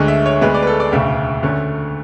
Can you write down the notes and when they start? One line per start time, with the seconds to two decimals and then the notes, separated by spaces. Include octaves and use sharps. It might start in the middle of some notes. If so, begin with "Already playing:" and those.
Already playing: D2 D3 G#3
0.08 E5
0.26 C#5
0.41 D2 D3 G#3 B3 B4
0.54 D5
0.62 B4
0.67 A4
0.80 D5
0.92 E1 D2 C#3 E5
1.42 D2 D3 A3 C#4